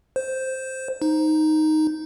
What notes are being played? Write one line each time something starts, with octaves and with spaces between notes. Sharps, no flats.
C5
D#4